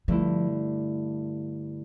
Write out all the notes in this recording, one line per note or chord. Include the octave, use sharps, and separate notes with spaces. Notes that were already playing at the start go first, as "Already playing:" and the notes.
G2 D3 F3 A3 E4